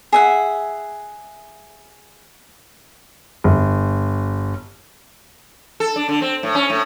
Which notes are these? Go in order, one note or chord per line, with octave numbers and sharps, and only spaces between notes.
G#4 E5 F#5
G1
A4
D4
D3
C4
A2
C#4
A2